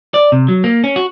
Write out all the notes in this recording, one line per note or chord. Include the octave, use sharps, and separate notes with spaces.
D5
C3
F#3
A#3
C#4
F#4